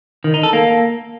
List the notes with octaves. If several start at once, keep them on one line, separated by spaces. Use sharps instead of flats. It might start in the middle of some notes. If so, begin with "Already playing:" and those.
D#3
D#4
A4
A#3